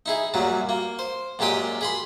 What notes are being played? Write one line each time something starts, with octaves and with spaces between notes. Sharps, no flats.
D#4 E4 G#4
F#2 A#2 F#3 G3
A#3
C5
F#2 A#2 G#3 G4 G5 D#6
G#4 B5 C6